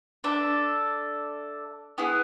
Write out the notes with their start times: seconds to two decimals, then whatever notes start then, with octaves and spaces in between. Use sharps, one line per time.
0.24 D4 A4 E5
1.98 B3 E4 G#4